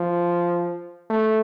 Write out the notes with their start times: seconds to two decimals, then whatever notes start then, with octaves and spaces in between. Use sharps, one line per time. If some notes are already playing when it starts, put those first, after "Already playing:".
Already playing: F3
1.10 A3